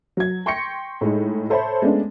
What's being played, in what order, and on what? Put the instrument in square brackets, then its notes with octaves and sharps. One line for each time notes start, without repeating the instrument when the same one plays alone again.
[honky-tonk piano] F#3 G#6
G5 C6 C#6 G6 A#6 C#7
A2 G#3 D#4
A4 C5 C#5 E5 A5 B5
G#3 A3 B3 C#4 D4